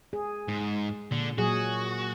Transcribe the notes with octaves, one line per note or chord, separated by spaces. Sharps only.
G#4
G#2
A#2 D3
A#2 F#3 F#4 G#4